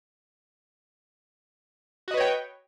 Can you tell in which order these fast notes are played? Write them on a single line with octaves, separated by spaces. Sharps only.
F#4 D#5 B4 C#5 G5